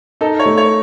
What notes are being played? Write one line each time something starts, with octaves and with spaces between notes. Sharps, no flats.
D#4 A4
C#5
A3
C#5